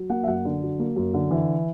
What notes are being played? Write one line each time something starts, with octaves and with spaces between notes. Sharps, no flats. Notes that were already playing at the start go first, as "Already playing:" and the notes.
Already playing: F#3
A#3 F#5
E5
F#2 F#5
D3
F#3
A#3
F#2
D3
E3